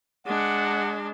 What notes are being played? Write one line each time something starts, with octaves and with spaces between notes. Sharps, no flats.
G#3 D4 F#5